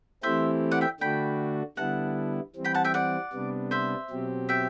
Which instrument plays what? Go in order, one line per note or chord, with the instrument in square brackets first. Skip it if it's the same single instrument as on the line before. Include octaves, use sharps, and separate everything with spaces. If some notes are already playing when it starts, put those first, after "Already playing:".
[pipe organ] E3 A3 C4 E4 G4 [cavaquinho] C5 E5
[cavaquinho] D5 F#5
E5 G5
[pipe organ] D3 A3 D4 F#4 [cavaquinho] G5 B5
[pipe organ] D3 G3 B3 E4 [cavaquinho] F#5 A5
[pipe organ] E3 G3 C4
[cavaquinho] G5 B5
F#5 A5
E5 G5
D5 F#5
[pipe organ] C3 G3 B3 D4
[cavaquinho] C5 E5
[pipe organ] B2 F#3 C4 G4
[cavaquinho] E5 G5